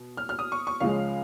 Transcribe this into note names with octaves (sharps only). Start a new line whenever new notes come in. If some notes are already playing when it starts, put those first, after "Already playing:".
Already playing: B2
F6
F6
D#6
C#6
C#6
C#2 C#3 F3 G#3 C#4 F5